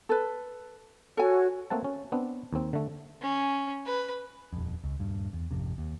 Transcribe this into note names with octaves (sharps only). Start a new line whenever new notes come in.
A4 B4
F#4 A4 C#5 G#5
A3 A#3 C4 F#5 A5
C#4
B3 C4 D4
D#2 C4
D3 A3
C#4
B4
D#1 F2
C#2
D#1 G2
E2
G#1 F2 C3
D#2